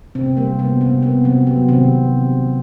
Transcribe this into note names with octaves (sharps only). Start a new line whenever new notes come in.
C3 C4
G3 A#3
C3 B3
C3 C4
A#3 B3
C3 F#3 C4
F#3 B3
C3 D#3 C4